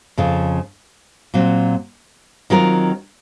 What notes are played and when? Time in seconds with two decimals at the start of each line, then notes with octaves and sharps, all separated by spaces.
0.17 F2 C#3 F3
1.34 A#2 F#3 C4
2.50 D#3 F#3 C4 F4 A#4